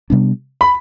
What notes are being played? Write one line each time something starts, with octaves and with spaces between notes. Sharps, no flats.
C3 G3 B3 D4
B5